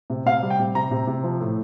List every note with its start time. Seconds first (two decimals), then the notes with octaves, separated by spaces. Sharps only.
0.10 C3
0.26 C3 F5
0.43 G3
0.50 G5
0.59 C3
0.75 C3 A#5
0.91 C3
1.07 C3
1.23 F3
1.40 A2